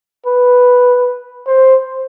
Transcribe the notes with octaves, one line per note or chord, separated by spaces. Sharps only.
B4
C5